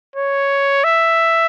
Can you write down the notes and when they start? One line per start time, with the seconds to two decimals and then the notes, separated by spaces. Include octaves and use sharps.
0.16 C#5
0.84 E5